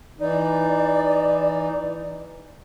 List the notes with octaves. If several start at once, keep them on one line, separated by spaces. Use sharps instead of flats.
E3 D#4 D5